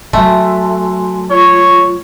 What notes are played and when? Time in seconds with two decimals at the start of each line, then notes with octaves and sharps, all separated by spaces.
0.13 F#3 A3 F#4 G#5 C6
1.30 F4 C#5 C#6